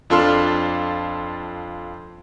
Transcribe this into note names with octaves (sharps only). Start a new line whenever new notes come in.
F2 D4 F4 A4 C6 F6